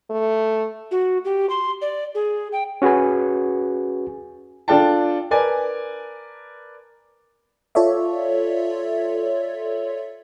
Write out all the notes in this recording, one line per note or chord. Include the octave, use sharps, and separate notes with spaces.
A3
F#4
G4
C6
D5
G#4
G5
C#4 F#4 G#4 B4 G#5
D4 F4 A4 D5 G5 A5
A#4 B4 D5 G#5 A5
F4 A4 C#5 D5 E5